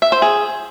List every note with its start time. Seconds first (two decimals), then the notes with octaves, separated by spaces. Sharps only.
0.02 E5
0.12 C5
0.22 G#4